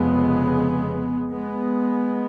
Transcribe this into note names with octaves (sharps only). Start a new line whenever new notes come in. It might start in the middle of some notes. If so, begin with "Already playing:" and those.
Already playing: F1 F2 C#3 G#3 B3
G#3 B3